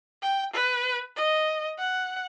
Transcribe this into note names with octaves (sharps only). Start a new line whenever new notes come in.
G5
B4
D#5
F#5